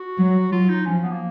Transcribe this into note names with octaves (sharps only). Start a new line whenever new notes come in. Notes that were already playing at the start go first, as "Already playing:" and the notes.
Already playing: F#4
F#3
F#3 F4
D#4
F3 C#4
B3
A#3